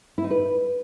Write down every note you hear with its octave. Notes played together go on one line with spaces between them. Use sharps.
E4
D#4
B4